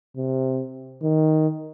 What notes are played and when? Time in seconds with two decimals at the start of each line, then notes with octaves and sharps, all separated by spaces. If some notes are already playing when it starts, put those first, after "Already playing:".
0.17 C3
1.03 D#3